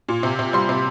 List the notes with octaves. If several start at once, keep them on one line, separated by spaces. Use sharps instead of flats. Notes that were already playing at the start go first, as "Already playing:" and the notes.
A#2
C3
C3
G3 C6
C3